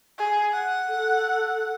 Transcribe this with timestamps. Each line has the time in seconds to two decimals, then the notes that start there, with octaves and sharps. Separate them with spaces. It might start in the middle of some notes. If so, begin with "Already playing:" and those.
0.18 G#4
0.53 F#5
0.88 A4